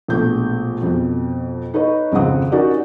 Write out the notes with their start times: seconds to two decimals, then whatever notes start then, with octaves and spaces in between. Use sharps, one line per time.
0.08 A#1 B2 A3 G6
0.83 F2 B2
1.74 D#4 B4 C#5 D#5
2.12 G#1 F2 C#3 C4 F#5 D#6
2.52 C#4 D#4 F#4 G4 A#4 D5